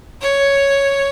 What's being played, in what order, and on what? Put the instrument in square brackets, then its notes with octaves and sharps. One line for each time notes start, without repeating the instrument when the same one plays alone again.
[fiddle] C#5